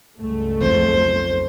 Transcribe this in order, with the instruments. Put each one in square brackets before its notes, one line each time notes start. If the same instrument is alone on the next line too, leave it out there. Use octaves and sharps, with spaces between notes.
[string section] C#2 G2 A3
[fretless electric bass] B1 F2 F3 [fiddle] C5